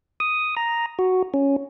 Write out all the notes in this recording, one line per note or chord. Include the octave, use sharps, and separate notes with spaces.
D#6
A#5
F#4
C#4